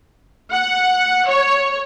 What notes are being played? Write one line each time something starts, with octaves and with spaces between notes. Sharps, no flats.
F#5
C#5